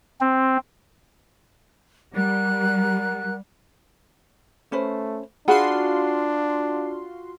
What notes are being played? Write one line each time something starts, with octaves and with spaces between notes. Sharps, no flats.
C4
G3 A#4 F#5 F#6
A3 C#4 B4 C5
D4 F4 F#4 G#4 F#5 B5 C6